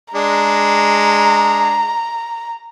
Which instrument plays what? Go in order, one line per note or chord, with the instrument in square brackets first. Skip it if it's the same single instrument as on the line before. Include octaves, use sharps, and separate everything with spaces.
[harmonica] G#3 D4 [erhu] A#5